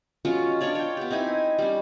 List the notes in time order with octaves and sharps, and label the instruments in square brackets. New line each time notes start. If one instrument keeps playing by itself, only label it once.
[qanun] F#3 G#3 C#4 F4
D4 F4 C#5 D5
C#5 G5
B3 G4
C4 D#4 E4 G#5
G3 C#4